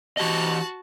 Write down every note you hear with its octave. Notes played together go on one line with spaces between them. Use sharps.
E3 F#4 G4 D#5 A5